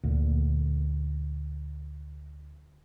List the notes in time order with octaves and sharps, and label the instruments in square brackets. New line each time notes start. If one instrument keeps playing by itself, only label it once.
[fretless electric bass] D2 A#2